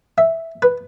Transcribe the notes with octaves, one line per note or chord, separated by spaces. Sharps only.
E5
B4